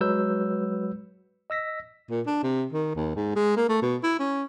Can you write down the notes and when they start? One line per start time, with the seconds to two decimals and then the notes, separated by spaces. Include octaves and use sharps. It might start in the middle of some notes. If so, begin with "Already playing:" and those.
0.01 F#3 G#3 B4 E6 G6
1.50 D#5 E6 A#6 B6
2.10 A#2
2.26 D4
2.43 C3
2.73 D#3
2.95 D#2
3.15 G#2
3.36 G#3
3.56 A#3
3.69 A3
3.82 B2
4.03 E4
4.19 C#4